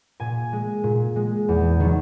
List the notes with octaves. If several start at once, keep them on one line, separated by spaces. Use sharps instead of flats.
A#2 G#5
G#3
A#2
G#3
E2
D#3 F#3